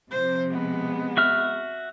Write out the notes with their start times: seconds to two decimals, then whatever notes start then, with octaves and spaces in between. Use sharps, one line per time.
0.11 C3 F3 C5
0.49 G#3 B3
1.17 F#4 E5 F6